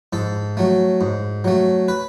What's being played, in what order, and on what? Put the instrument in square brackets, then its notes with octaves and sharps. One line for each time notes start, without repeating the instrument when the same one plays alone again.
[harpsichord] G#2 A4
F#3 A3
G#2
F#3 A3
B4